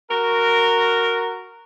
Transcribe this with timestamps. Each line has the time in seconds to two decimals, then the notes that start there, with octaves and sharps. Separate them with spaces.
0.11 F#4 A#4